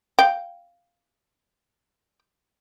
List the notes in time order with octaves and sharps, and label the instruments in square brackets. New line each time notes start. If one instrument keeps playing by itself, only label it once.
[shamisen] F5 G5